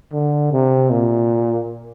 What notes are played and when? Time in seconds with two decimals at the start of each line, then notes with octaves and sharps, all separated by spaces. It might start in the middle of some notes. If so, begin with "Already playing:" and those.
0.13 D3
0.52 C3
0.90 A#2